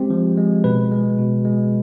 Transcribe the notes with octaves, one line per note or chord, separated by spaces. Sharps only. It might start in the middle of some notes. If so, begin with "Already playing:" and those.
Already playing: G#3 C4 G4
F3
G#3
B2 B4
G#3
B2
G#3